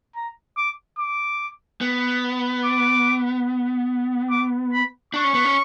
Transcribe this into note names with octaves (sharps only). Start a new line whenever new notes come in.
A#5
D6
D6
B3
D6
D6
B5
D4 C#6
C#4
B3
C#4